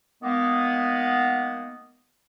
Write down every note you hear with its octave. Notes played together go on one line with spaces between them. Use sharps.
D#3 G#3 A#3 B3